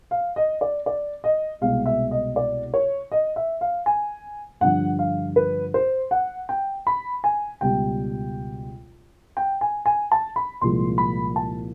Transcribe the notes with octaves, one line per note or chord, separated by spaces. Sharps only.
F5
D#5
D5
D5
D#5
C2 B2 G#3 F5
E5
D#5
D5
C#5
D#5
E5
F5
G#5
G2 D3 F3 F#5
F5
B4
C5
F#5
G5
B5
G#5
C#2 B2 G3 G5
G5
G#5
G#5
A5
B5
C2 A#2 F3 G#3 C6
B5
A5